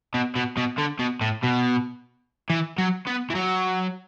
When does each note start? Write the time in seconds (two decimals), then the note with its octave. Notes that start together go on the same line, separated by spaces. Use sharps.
0.14 B2
0.36 B2
0.57 B2
0.78 D3
0.99 B2
1.21 A2
1.43 B2
2.50 E3
2.78 F#3
3.07 B3
3.30 E3
3.35 F#3